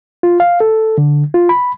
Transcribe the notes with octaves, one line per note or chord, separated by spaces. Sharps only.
F4
F5
A4
D3
F4
B5